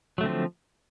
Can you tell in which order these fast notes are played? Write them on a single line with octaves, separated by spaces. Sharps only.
F#3 A3 D3 C4 F3